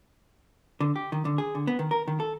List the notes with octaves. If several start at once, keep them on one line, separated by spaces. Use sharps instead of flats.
D3
G4
D#3
D3
G#4
D3
B3
D#3
A#4
D#3
A4